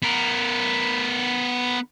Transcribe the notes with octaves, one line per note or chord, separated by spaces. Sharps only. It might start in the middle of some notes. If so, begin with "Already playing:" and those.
B3 A#4